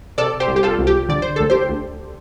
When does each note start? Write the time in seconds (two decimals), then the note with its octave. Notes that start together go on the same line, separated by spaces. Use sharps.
0.18 C3 A4 D5
0.40 G4 C5
0.48 C2
0.56 G4
0.63 F4 A4
0.79 C2
0.87 G4
1.09 D3 D5
1.22 C5
1.36 D2 A4
1.50 G4 C5
1.69 D2